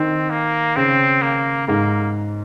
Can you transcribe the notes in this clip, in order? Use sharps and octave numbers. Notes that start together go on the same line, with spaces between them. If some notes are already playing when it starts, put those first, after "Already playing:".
Already playing: D#3 C4
A#3
C#3 C4
A#3
G#2 A#3